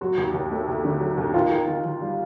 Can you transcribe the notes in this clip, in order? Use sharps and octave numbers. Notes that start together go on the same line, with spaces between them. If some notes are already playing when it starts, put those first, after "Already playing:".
F#3 F#4
D#2
D#2
A3
D#2
D3
F#3
D#2
D#3 F4
D#3
D#3
D#3
G3